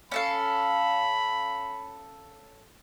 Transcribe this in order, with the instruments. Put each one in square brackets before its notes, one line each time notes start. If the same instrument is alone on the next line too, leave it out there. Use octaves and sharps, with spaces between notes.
[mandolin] C#4 A4 F5 [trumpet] B5